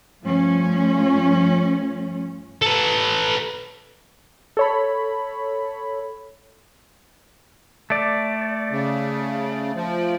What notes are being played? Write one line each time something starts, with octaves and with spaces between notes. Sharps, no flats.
G2 F3 A3 C#4
A4 B4
A4 C#5 B5
A3 D5
C#3
F3